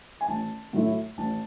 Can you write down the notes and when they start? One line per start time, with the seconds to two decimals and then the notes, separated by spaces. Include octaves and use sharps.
0.21 G#5
0.28 A1 A5
0.73 A2 F#3 A3 E4
1.18 A1 A5